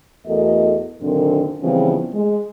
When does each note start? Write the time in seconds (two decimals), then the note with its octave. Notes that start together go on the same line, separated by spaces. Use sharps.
0.27 E2 A3 F#4 A4 A#4 D#5
1.02 F#2 A#2 D3 D#3 C4
1.62 C#3 E3 F3 G3 B3 C4
2.15 G#3